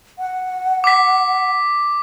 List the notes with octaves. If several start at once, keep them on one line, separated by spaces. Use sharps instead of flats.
F#5
D6 B6